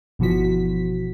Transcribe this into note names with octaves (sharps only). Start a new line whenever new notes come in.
G1 B2 E3 F3 F#4 B6